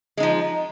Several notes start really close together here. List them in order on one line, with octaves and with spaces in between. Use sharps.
G#3 D#4 F3